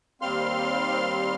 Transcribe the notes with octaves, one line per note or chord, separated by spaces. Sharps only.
D#2 G3 C4 F5 C6 F6